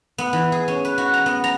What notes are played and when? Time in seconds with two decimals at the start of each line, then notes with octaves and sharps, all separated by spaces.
0.18 B3
0.33 E3
0.52 G#4
0.68 C#4
0.85 B4
0.98 F#4
1.14 A#5
1.26 B3
1.44 A#5